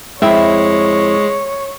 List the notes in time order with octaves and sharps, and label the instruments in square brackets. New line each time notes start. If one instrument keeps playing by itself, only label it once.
[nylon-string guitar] F2 E4 G5 [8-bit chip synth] G#3 [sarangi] C#5 [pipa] E5